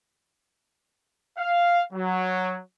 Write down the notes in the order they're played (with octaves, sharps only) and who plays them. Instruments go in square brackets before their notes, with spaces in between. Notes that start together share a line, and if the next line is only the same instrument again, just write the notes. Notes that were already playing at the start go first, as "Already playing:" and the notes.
[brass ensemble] F5
F#3